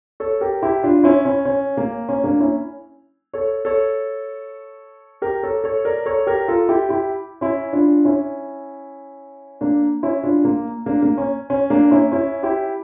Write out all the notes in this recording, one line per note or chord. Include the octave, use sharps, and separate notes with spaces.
A4 C#5
G4 A#4
E4 G4
D4 F4
C#4 E4
C#4
C#4
A#3
C#4
A#3 D4
C#4 E4
A4 C#5
A4 C#5
G4 A#4
A4 C#5
A4 C#5
A#4 D5
A4 C#5
G4 A#4
F4 A4
E4 G4
E4 G4
C#4 E4
D4 F4
C#4 E4
A#3 D4
C#4 E4
D4 F4
A#3
A#3 D4
A#3
C#4
C#4
A#3 D4
C#4 E4
C#4 E4
E4 G4